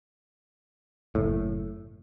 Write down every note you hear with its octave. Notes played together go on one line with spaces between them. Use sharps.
F#1 A2